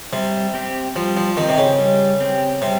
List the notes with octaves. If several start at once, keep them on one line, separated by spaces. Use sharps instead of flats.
C3 G3
C4 G4
F3 G3
F3
D#3 C4 G4
C3
C#3
G3
C4 G4
C3 G3